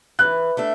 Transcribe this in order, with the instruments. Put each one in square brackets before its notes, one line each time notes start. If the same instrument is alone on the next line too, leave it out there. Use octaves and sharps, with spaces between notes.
[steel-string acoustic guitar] E3 [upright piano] F#6
[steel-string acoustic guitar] A3 D4 A4